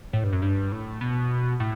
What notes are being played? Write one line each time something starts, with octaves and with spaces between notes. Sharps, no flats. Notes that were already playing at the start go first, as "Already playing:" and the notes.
A2
G2
F#2
G2
A2
B2
A2